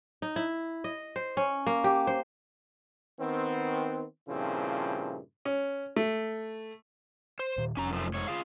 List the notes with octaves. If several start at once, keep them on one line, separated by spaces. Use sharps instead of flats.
D#4
E4
D#5
C5
C#4
A#3
G4
C5
D#3 B3 C4
G2 A#2 C#3 F3 C4 E4
C#4
A3
C5
A#2 D#3
F1 C#4 A#5
F#2 F3 A3
G#2 C#5
F4 G#4 F5